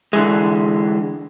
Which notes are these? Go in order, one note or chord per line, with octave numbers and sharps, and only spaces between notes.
D3 E3 G#3